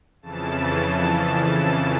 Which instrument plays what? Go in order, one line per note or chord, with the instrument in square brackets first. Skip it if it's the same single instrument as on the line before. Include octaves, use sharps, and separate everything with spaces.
[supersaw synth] F2 C#3 E3 A5